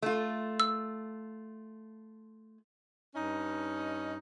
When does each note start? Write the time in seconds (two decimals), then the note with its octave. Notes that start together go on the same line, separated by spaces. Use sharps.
0.02 A3 F4
0.60 E6
3.15 G2 C#4 D#4